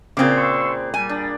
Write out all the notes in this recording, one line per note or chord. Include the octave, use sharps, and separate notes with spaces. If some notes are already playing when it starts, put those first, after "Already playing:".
A#2 C#3 C4 G#4 D6
C6 C#6 E6
G3 G#5
D4